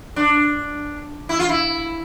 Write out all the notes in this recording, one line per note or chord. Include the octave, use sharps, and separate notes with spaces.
D4
E4
F4
E4